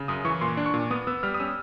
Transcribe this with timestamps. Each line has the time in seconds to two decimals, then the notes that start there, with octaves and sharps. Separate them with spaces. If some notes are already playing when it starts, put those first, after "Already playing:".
Already playing: C#3
0.08 F#2 D#6
0.25 E3 C#6
0.41 A#2 C6
0.57 D4
0.66 C#6
0.74 A#2
0.90 B3 D#6
1.07 B3 E6
1.23 G3 F6
1.34 D#6
1.40 C#4 E6